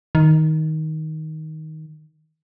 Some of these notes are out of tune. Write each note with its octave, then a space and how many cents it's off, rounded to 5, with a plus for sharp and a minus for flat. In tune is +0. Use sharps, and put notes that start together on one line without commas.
D#3 +10